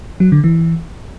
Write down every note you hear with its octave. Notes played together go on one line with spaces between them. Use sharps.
F#3
D3
E3